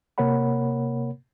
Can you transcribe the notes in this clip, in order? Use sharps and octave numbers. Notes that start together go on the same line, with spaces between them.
C3 A#3 A#4 C#5 F#5 B5